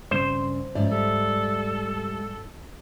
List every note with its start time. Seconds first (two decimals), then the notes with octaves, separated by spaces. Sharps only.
0.11 G2 C#3 C4 C5
0.75 G#2 F3 C#4 D5 E5
0.91 G3 A4